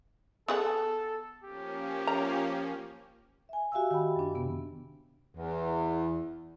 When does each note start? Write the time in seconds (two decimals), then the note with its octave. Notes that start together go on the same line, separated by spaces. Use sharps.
0.48 B3 G#4 A4 F#5
1.44 F3 A#3 C#4 G4
2.07 A#5
3.49 E5 G#5
3.72 F#4 G4 E5 F5 G#5 E6
3.91 D#3 F#4 G5 B5
4.16 F#2 D4
4.35 C3 D#3 B3
5.36 E2